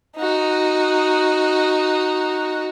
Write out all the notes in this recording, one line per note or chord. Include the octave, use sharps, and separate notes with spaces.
D#4 F#4